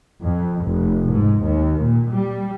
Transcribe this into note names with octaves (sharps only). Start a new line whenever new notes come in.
F2
F1
G#2
D#2
A#2
G3